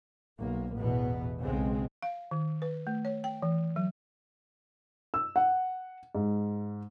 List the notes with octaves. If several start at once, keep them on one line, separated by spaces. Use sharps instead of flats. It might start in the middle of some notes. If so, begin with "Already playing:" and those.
B1 A#3
A1 E2 B2 B3
B1 C#3 G#3 C4
F5
D#3
B4
A3
C#5
G5
E3
F#3
E6
F#5
G#2